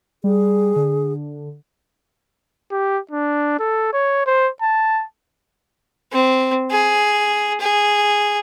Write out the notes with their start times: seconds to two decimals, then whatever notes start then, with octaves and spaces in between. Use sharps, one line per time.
0.24 G3 G#4
0.76 D3
2.71 G4
3.11 D4
3.59 A4
3.93 C#5
4.26 C5
4.62 A5
6.12 C4
6.70 G#4
7.60 G#4